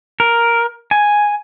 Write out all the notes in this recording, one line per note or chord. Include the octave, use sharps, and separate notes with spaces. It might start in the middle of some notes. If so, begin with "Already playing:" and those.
A#4
G#5